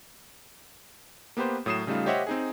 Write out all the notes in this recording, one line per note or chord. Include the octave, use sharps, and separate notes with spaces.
A#3 B3 G4 B4 C5
A2 F#3 D#6 C7 E7
C#3 G3 A3 D#4 F4
G4 C5 C#5 D#5 E5 F#5
C4 D#4 G#4